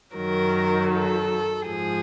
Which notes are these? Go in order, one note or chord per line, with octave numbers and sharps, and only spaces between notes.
F#2 D#3 F#3 A#4
A4
G#2 F3 G#4